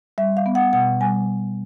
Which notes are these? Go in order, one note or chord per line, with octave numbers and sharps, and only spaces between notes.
G3 E5
F5
B3
F#5
B2 F#5
G3 G#5